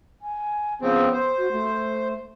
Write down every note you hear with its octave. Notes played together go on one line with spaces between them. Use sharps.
G#5
C#3 F3 B3 C4
C5
F#4
A3